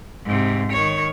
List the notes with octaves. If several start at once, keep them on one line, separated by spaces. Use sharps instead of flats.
G#2 C3
D#3 C#5